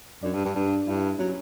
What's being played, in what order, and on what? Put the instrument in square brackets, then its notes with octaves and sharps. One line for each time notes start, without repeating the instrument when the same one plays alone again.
[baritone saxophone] F#2 [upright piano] D4
[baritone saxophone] G2
G2
[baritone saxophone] G2 [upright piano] D4
[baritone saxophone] G2 [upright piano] E4
[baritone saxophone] F#3 [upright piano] C#4